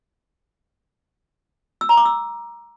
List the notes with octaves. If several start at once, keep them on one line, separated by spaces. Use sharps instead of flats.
E6
A#5
D6
E6